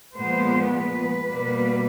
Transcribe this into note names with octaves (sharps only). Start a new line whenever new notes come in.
A#2 F3 G#3 B3 C5
B4
B2 G3 A#3